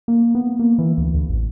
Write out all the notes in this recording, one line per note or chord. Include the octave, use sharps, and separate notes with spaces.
A#3
B3
A#3
E3
D2
D2
A1